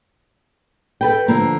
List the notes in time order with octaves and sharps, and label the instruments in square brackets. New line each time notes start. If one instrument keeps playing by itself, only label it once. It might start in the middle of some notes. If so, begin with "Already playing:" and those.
[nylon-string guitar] A4 B4 G5
D3 F3 A#3